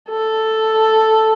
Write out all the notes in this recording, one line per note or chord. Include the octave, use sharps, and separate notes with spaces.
A4